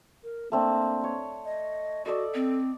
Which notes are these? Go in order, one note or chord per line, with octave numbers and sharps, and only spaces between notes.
A#4
A3 A#3 C4 D4
C#5
D#5
F#4 A4 D5 D#5
C4